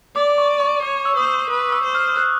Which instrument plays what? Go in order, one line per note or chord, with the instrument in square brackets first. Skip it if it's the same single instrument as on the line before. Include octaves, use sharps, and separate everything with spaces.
[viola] D5 [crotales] D6
[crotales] C#6
C#6
[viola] C#5 [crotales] D6
[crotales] E6
[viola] C5 [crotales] D#6
[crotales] E6
[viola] B4 [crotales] D#6
[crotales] E6
[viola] C5
[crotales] F6
F#6